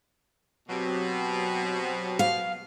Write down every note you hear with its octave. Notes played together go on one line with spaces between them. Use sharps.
B2 F#3 C4 G4
F5